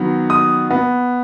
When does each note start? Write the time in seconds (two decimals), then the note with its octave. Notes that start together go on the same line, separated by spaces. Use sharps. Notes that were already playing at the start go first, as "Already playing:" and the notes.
Already playing: D#3 F#3 B3
0.30 D#6
0.70 B3